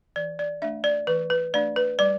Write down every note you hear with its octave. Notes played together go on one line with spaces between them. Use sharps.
E3 D5
D5
A3 D4 E5
D5
E3 B4
B4
A3 D4 D5
B4
G3 D5